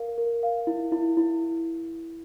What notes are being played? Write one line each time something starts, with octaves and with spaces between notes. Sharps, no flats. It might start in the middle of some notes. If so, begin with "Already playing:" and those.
Already playing: A#4 F5
A#4
F5
E4
E4
E4